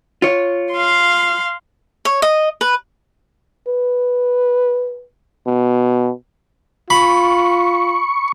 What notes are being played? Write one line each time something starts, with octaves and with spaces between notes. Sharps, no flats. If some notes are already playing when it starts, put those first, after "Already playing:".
F4 C#5
F5 C6
C#5
D#5
B4
B4
B2
F4 B5 C#6